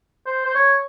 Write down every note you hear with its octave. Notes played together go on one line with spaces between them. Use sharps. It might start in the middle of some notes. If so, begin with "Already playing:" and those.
C5
C5
C#5